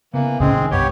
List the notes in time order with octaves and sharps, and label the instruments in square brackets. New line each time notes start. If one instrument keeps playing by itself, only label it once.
[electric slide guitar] C#3 B3 [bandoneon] E3 A#3
[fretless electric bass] C#2 A2 C#4 [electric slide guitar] C#3 [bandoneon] G#3 C4 G#4
[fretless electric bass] D#3
[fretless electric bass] C2 G2 [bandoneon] B3 G4 C#5 [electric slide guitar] G5